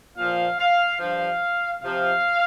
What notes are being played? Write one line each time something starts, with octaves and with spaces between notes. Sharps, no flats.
A#2 F3 F5
F5
G2 F3 F5
C3 F3 F5